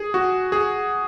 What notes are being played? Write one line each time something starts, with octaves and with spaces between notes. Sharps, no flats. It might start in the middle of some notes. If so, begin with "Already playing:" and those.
Already playing: G#4
F#4
G#4